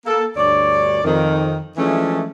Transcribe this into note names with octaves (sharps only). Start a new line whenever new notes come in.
A#3 A4
D2 G2 C#5 D5
F2 D#3
E3 F3 G#3 A3 C#4 D4